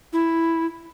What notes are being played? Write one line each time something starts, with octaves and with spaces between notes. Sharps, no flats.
E4